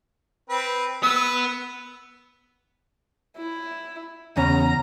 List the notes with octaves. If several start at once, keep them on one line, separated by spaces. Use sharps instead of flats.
C4 B4
B3 B4 E6
E4
E2 C#3 C#4 A#5